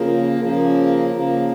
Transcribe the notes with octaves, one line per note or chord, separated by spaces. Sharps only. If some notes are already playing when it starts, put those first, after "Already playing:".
Already playing: C#3 F3 A#3
C#3 F3 A#3
C#3 F3 A#3